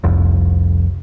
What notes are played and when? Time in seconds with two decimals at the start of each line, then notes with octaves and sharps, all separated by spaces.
0.04 F1 C2 F2